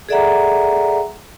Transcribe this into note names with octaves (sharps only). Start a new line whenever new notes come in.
G#4 A4 D5 E5 F#5 A#5